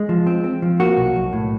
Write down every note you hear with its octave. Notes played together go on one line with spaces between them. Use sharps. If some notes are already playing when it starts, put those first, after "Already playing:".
Already playing: G#3
F3
C4
C4
F3
A#3 F#4
B1
B1
A2